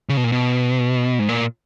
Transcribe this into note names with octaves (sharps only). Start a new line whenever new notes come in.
C#3
B2
A#2
B2
G#2
A#2